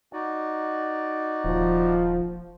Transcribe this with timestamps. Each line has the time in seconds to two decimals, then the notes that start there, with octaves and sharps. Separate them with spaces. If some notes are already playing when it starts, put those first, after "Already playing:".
0.13 D#4 F#4 D5
1.44 D#1 F3